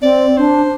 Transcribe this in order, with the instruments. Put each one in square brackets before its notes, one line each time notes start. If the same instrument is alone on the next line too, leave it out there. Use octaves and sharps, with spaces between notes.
[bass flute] C4 [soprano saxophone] D5
[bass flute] D4 [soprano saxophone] C5